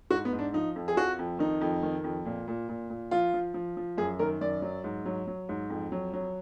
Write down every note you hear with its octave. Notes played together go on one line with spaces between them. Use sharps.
G#2 F#4
B3
G#2
D4
F3 D#4
F2
G#4
F3 F#4
F2
D#3 D#4
F2
D#3
F2
A#2
A#2
A#2
A#2
F3 F4
F3
F3
F3
F#2 G#4
D#3 A#4
F#2 D5
F#3
G#2
F#3
F#3
G#2
F2
F#3
F#3